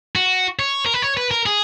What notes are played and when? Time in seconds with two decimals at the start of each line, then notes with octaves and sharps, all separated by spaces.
0.16 F#4
0.59 C#5
0.86 A#4
0.94 B4
1.02 C#5
1.17 B4
1.31 A#4
1.46 G#4